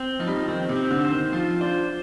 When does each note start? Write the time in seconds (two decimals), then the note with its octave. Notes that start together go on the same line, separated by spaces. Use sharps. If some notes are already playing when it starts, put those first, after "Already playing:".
Already playing: C4
0.19 F3 D#4
0.27 G3
0.36 F3
0.48 D#3 C4
0.69 C3
0.76 C4
0.91 D3
1.05 C5
1.11 D#3
1.32 F3 F4
1.61 D4 C5